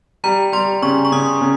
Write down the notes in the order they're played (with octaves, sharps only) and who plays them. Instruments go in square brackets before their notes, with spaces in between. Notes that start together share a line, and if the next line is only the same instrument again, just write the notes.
[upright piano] G3 [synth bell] A#5
[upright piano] G3 [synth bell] C6
[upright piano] C#3 [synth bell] C#6
[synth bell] C#6
[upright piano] C#3 [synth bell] D#6
[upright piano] C#3